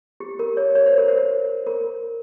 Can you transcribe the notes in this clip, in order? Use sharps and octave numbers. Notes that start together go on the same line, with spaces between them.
G4
A#4
C#5
C#5
C5
A#4
C5
A#4